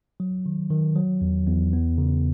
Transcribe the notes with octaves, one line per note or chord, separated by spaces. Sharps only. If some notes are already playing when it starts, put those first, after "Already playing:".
F#3
D#3
D#3
F#3
E2
E2
B3
C#3